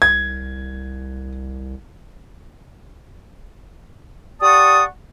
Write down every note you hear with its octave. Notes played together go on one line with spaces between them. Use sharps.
C2 G#6
G4 D5 F#5 A5 C#6 D#6